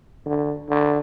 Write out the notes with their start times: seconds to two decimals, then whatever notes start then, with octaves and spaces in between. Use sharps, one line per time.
0.26 D3
0.69 D3